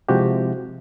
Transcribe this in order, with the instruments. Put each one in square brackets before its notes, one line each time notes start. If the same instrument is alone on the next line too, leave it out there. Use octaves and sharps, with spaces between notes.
[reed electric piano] C3 F3 G#3 E4 F#4 G4